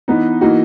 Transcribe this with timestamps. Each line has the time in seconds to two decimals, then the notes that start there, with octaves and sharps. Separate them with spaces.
0.08 E3 B3 D#4
0.41 E3 A#3 D#4 F#4